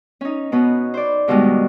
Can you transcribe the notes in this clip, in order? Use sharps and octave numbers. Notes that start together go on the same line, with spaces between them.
C#4 D#4
B2 B3 C#4
C5 D5
G#2 B2 D#3 G3 G#3